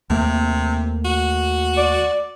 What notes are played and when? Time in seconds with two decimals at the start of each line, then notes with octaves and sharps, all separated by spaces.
0.10 D#2 C3 A3 A#3
1.05 F#4
1.77 D5